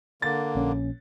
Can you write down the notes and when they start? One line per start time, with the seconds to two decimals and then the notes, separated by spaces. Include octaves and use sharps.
0.22 D3 A#3 A6
0.55 A#1 C#4